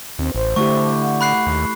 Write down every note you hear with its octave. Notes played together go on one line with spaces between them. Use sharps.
D#2 C4
A1 C5
D3 A3 E4 G4 C#6
F#5
B5 F#6 C7
D#2